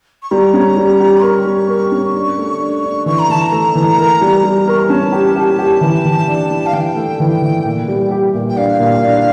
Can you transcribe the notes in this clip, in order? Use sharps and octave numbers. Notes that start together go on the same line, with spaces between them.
C#6
G3 A#5
C#4
G3
G4
A#4 C#6
G3
A#4
C#4
D4
A3
D4
D4
E3 C#6
A#5
E3 A5
A#5
A3
E3
A#4
G3
G3
A#4 C#6
A#5
C#4 A5
G4
G4
G4
E3
E3
D4
E3
F5
E3 G5
A3
E3
E3
A#2
G3
G4
A#2
G5
D4 F5
A#2
D4